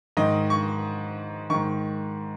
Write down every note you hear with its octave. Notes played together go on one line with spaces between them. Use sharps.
G#2 D#3 D#5
C#6
G#2 D#3 C#6